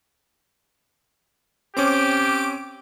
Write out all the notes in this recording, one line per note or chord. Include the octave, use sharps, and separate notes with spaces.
C4 C#4 G4 D6 D7